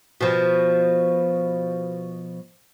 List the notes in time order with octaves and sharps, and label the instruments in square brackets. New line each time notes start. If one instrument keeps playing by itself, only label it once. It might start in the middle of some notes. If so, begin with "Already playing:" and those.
[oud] B2 F3